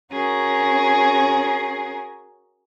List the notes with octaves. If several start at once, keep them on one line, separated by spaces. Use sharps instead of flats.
C#4 F#4 G#4 A#4